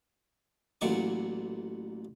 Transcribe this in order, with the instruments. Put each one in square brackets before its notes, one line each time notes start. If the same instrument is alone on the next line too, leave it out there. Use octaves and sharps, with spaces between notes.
[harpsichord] A1 A#2 F#3 C#6 D6